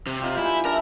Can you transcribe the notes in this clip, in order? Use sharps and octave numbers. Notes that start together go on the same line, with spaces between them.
C3
D#4 F4 G4
G3 E4 G#4 B4
D4 E4 A#4 A#5 B5